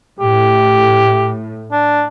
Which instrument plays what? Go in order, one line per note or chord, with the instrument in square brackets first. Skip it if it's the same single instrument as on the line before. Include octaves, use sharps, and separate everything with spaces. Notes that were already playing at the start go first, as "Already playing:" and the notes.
[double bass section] A2 [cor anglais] G4
[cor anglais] D4